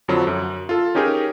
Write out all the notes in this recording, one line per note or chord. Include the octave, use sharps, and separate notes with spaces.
F2 D3 F3 F#3
F#2
F4 A4
C#4 D#4 G4 G#4 A#4